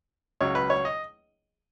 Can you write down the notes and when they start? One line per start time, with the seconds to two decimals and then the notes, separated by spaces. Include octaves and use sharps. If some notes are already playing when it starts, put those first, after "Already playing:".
0.41 C#2 C#3 F#3 C#5
0.55 B4
0.70 C#5
0.85 D#5